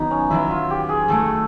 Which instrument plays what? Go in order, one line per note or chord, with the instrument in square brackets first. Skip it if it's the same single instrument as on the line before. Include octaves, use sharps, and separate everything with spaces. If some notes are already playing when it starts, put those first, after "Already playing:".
Already playing: [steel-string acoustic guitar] D#3 F#3 B3 [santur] D#4
[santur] C#4
[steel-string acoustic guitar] D#3 F#3 B3 [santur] E4
[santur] F4
G4
G#4
[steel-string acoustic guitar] D#3 F#3 A3 [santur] A4